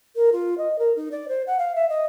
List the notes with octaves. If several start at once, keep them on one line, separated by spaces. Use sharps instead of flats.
A#4
F4
D#5
A#4
D#4
D5
C5
F#5
F5
E5
D#5